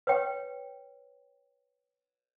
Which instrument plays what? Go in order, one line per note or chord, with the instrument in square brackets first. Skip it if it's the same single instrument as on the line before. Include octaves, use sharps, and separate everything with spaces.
[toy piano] B4 C#5 G5